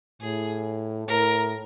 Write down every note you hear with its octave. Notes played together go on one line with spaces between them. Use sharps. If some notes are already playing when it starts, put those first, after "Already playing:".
A2 G#4
A2 A#4